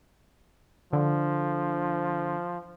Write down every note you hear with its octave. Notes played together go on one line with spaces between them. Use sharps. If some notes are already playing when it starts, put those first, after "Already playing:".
D3 F3